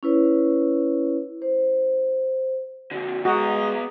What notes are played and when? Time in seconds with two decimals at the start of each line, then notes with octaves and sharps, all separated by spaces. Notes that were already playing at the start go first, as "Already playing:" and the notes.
0.03 C#4 E4 B4 C#5
1.42 C5
2.91 F2 D3 F#4
3.25 G#3 B3 F#4 D#5 A#5